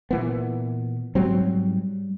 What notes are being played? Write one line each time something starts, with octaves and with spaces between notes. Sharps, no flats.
A#2 E3 B3
G#2 F#3 G3 C4